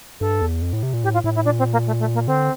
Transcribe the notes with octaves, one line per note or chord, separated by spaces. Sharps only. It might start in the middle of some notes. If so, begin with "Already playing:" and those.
G2 A4
E2
F2
A2
C3
A#2
A2 G4
F4
A2 E4
E4
A#2 D4
C4
A#3
A3
A3
A#3
D3 C4